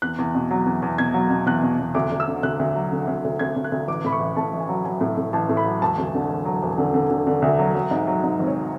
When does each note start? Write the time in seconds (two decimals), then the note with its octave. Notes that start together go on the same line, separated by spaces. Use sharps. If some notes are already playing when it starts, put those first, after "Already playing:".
0.02 E2 F#6
0.18 E2
0.35 B2
0.51 F#3
0.66 E2
0.82 E2
0.98 B2 G#6
1.14 F#3
1.30 B2
1.46 E2 F#6
1.63 B2
1.79 E2
1.95 D2 D6
2.12 D2
2.20 E6
2.28 D3
2.43 D2 F#6
2.59 D2
2.75 F#3
2.92 D3
3.08 D2
3.24 D2
3.39 D2 G#6
3.56 D2
3.64 F#6
3.72 D2
3.88 A1 D6
4.04 A2 B5
4.13 C#6
4.20 A1
4.37 A2 A5
4.53 A1
4.60 G#5
4.69 F#3
4.85 F#3 G#5
5.01 A2
5.17 A2
5.33 A1 A5
5.49 A2
5.57 B5
5.65 F#3
5.81 E1 A5
5.98 D2
6.14 D3
6.30 E1
6.45 F#3
6.62 E1
6.78 D3
6.94 D3
7.11 D3
7.27 D3
7.42 D2
7.59 F#3
7.75 F#3
7.91 G#2
8.07 F#3
8.23 G#2
8.39 G#1
8.47 C#5